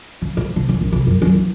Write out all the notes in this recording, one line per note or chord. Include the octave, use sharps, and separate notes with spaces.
C#3
G#2
C3
F2
A#1
C3
F#2
F#2
E3